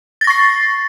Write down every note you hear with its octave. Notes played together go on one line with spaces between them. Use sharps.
C#6 A6 A#6 C7